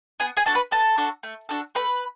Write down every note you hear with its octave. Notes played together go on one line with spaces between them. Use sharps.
B3 G#4 G#5
G#4 G#5
D4 F#4 A4 A5
B4 B5
B3 A4 A5
D4 F#4 A4
A3
D4 F#4 A4
A3 B4 B5